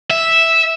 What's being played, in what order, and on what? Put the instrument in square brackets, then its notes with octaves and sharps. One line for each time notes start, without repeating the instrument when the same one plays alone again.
[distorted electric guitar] E5